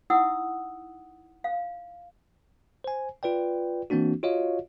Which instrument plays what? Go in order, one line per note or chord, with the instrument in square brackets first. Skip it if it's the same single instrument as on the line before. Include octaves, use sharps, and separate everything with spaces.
[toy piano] D#4 E4 F#5 D#6 E6
F5
[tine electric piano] C5 G#5
F4 B4 D5 G5
E3 A#3 C4 D4 F#4
F4 F#4 C#5 D#5 F5